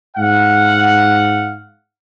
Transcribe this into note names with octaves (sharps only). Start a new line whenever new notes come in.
G#2 F5 F#5